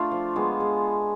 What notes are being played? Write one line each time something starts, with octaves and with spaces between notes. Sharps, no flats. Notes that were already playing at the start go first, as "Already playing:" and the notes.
Already playing: A3 D4 F4
F3
G#3 B3
G#3